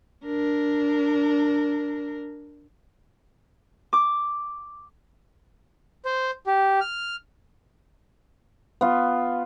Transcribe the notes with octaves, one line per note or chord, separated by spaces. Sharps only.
D4 A#4
D6
C5
G4
F6
B3 F4